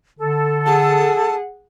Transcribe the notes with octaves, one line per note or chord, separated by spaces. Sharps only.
D3 A4
G#4 F#5 A5